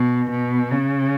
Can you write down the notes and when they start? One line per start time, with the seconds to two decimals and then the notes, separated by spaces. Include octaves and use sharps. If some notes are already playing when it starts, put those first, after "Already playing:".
Already playing: B2
0.30 B2
0.71 C#3